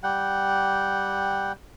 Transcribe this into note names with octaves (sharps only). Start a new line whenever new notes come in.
G3 F#5 G5